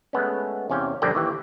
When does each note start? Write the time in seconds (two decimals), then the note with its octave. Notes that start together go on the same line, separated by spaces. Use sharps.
0.13 G#3 A3 B3 C#4
0.70 E2 C3 C#4 F5 G5
1.02 A#1 G2 D3 A#3 D5 G5
1.15 D#2 E3 G4